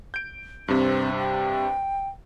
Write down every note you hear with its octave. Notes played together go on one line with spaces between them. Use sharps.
G6 D7
G2 C3 C4
G5